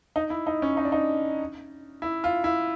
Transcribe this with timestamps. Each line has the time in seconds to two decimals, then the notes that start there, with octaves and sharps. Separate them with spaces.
0.16 D#4
0.30 E4
0.47 D#4
0.62 C#4
0.77 D#4
0.85 D4
0.92 D#4
2.02 E4
2.24 F4
2.44 E4